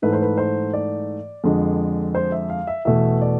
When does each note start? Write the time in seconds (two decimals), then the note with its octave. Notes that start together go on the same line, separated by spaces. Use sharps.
0.02 G#2 E3 A3 B4
0.12 C5
0.22 B4
0.38 C5
0.73 D5
1.44 F2 D3 G#3
2.15 C5
2.32 E5
2.50 F5
2.67 E5
2.85 E2 B2 A3 E5
3.22 D5